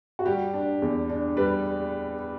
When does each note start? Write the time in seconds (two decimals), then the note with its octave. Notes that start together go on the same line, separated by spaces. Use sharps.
0.19 F#4
0.26 G3 G4
0.54 D4
0.82 E2
1.10 D4
1.37 G3 B4